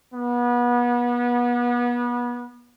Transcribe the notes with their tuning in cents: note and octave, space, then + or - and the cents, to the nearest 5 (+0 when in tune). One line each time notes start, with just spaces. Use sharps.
B3 -30